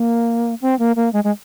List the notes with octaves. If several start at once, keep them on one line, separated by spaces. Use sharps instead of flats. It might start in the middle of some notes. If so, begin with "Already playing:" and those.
Already playing: A#3
C4
A#3
A#3
G#3
G#3